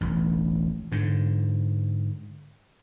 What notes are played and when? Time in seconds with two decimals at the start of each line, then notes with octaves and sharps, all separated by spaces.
0.01 E1 A1
0.92 G#2 D3